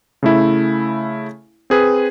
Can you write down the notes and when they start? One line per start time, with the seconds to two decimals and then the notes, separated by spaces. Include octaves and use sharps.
0.23 C#3 A3 E4
1.70 C4 G#4 B4